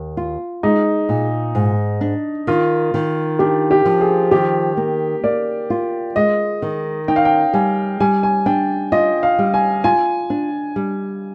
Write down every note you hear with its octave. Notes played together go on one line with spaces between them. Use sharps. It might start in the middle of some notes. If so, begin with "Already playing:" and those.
Already playing: D#2
F4
G#3 D#4
A#2
G#2
D4
D#3 F4
D#3
D4 G4
G4
F3
G#4
D#3 G4
A#3
A#3 D5
F4
G#3 D#5
D#3
D#4 G5
F5
G5
G3 G#5
G3 G#5
G#5
D4 G5
F4 D#5
F5
G3
G#5
F4 G#5
D4
G3